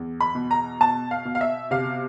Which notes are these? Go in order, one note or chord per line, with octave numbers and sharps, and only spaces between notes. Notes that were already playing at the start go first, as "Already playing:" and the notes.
Already playing: E2
B5
B2
A#5
B2 A5
F5
B2
F5
E5
C3 F5